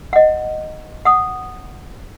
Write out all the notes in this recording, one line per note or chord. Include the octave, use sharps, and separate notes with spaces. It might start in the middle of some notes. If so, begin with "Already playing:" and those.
D#5 F#5
F#5 D#6